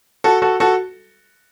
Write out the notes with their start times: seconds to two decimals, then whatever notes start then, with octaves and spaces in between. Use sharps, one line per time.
0.24 F#4 A4
0.42 F#4 A4
0.60 F#4 A4